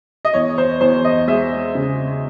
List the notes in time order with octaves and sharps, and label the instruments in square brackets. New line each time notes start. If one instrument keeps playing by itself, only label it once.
[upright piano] D#5
E2 C#5
C5
E2 C5
D#5
G#3 E5
C#3